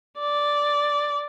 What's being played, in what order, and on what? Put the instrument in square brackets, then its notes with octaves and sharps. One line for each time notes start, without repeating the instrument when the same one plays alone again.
[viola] D5